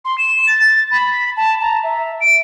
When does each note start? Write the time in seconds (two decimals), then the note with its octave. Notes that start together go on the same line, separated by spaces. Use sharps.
0.05 C6
0.18 E7
0.47 A6
0.91 B5
1.37 A5
1.62 A#5
1.84 E5
2.21 D7